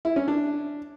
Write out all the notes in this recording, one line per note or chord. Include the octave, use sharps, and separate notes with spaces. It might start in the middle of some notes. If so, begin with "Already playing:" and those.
E4
C#4
D4